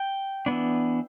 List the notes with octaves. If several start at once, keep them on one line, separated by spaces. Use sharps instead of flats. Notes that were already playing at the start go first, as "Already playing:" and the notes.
Already playing: G5
E3 B3 D4